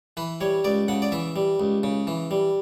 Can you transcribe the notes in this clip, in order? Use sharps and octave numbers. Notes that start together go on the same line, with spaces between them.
E3 B4
G3 C#5
C#2 D5
C#3 F#5
D5
E3 E5
G3
C#2
C#3
E3
G3